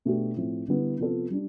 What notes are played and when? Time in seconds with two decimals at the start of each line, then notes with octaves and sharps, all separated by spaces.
0.05 B2 A3 D4 G4
0.36 A2 F3 A3 C4
0.68 D3 G3 B3 E4
0.98 C3 F3 B3 F4 A4
1.30 G3 D4